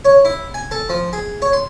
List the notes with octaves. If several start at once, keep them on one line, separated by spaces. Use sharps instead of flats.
C#5
E4
G#5
A4
F3
G#4
C#5
C6